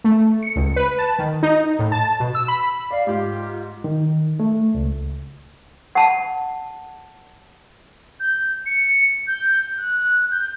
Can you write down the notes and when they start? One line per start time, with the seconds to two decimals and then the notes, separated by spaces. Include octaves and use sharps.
0.04 A3
0.43 C#7
0.56 C#2
0.76 B4
0.99 A5
1.19 D#3
1.43 D#4
1.79 A2
1.92 A5
2.20 B2
2.35 E6
2.48 B5
2.91 D5 F5
3.07 G#2 F4 G4
3.84 D#3
4.40 A3
4.75 C#2
5.95 F#5 A5
8.20 G6
8.66 C#7
9.27 G6
9.78 F#6
10.31 G6